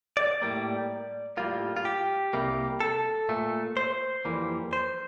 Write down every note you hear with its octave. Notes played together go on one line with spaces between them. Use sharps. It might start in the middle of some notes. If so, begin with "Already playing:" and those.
D5
A2 G3 A#3
A2 G3 A#3 F4
F4
G4
C2 C3 G3 A#3
A4
A#2 A3
C5
F2 E3 G3 A#3
C5